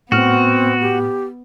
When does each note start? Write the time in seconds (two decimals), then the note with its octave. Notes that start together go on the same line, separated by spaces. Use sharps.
0.12 A2 B3 C4 F#4 F6
0.81 G4